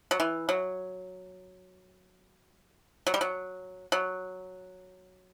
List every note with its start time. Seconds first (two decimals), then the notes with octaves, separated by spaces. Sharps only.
0.11 F#3
0.20 E3
0.49 F#3
3.07 F#3
3.14 G3
3.21 F#3
3.92 F#3